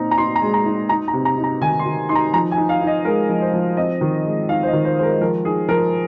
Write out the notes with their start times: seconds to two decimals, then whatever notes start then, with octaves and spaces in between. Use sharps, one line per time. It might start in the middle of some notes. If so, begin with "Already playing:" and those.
Already playing: A#2 C4 D#4 A#5
0.11 A#5
0.18 D#4 C6
0.36 A#5
0.42 G#3
0.54 A#5
0.65 D#4
0.89 D#4 A#5
1.08 A#5
1.13 C3
1.25 A#5
1.37 D#4
1.44 A#5
1.61 D#3 G#5
1.79 C6
1.86 D#3
2.09 D#4 C6
2.15 A#5
2.33 F3 A#5
2.51 G#5
2.57 D#4
2.69 F5
2.81 D#4
2.87 D#5
3.05 G#3 A#4
3.29 F3
3.42 C5
3.53 F3
3.77 C4 D#5
4.01 D#3
4.25 G#3
4.49 D#4 F5
4.63 C5
4.67 D#5
4.73 D#3
4.85 C5
4.97 G#3 C5
5.03 A#4
5.21 F3 A#4
5.45 D#4 G#4
5.69 F3 A#4